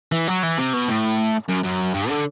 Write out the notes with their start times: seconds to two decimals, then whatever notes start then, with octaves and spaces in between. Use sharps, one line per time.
0.12 E3
0.28 F#3
0.43 E3
0.58 C3
0.73 B2
0.88 A2
1.48 F#2
1.63 F#2
1.94 G2
2.09 D3